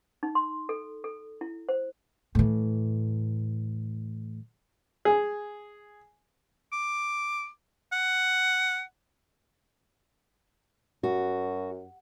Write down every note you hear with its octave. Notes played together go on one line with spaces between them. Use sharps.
D#4
C6
A4
A4
E4
C5
A2 E3
G#4
D6
F#5
F#2 F#4